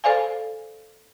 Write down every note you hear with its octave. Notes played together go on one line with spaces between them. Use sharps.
A4 C5 D5 F5 G#5